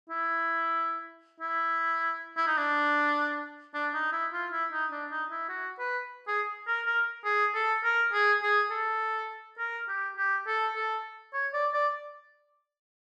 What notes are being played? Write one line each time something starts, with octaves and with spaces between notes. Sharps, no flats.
E4
E4
E4
D#4
D4
D4
D#4
E4
F4
E4
D#4
D4
D#4
E4
F#4
B4
G#4
A#4
A#4
G#4
A4
A#4
G#4
G#4
A4
A#4
G4
G4
A4
A4
C#5
D5
D5